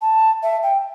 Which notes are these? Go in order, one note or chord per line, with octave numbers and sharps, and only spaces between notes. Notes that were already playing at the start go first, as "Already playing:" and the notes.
A5
E5
G5